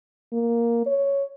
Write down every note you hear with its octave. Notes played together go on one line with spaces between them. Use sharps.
A#3
C#5